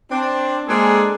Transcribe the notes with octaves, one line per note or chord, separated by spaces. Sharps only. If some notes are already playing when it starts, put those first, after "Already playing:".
C4 D4
G#3 A#3 C4 D4 G#4 A4